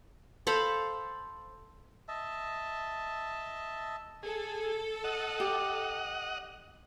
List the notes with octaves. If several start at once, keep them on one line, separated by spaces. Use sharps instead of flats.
A4 C5 F5 B5
D#5 E5 A5
G#4 A4
D#5 F#5
G4